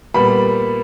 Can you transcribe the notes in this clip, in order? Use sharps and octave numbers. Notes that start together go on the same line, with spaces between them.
A#2 G3 B3 B5